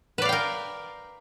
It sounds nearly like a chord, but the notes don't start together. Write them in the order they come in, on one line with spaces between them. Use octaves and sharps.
B4 D5 F5 G5 A#4